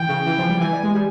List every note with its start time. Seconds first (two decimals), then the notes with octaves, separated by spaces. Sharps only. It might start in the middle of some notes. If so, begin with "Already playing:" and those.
Already playing: E3 G5
0.09 C#3
0.26 E3
0.39 F3
0.49 G3
0.60 E3 G#5
0.72 G3
0.84 G#3
0.95 G3